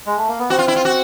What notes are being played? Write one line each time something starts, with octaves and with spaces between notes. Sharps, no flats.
G#3
A3
A#3
B3
C4 F#4
F4
E4
F4
F#4